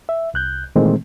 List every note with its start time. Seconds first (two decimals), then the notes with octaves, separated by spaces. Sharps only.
0.09 E5
0.34 C2 F#6 G6
0.76 A#2 D#3 E3 G#3 A3 C4